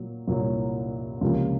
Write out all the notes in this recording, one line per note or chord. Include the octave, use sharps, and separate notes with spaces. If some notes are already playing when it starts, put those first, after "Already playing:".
Already playing: A#2 F#3
C2 A#2 F#3
C#2 C3 F3 A#3